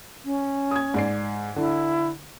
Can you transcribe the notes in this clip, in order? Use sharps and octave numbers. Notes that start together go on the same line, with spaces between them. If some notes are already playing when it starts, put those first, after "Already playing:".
C#4
D#6 G#6
G#2 D5 C7
D3 E4